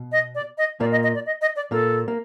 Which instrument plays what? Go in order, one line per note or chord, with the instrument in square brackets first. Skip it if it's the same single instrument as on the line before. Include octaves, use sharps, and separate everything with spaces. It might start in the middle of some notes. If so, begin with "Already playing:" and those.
Already playing: [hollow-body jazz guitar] B2
[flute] D#5
D5
D#5
[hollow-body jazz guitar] A#2 A#3 [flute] D5
[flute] D#5
D#5
D5
D#5
D#5
D5
[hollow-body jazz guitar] A#2 A#3 [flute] A4
[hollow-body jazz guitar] A#3